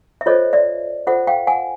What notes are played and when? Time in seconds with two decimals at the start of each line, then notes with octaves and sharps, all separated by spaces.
0.21 E5
0.26 F4 A4 C5 C#5 D#5
0.53 D5 E5
1.07 F4 A4 C5 E5 F#5
1.27 F5 G5
1.47 F#5 G#5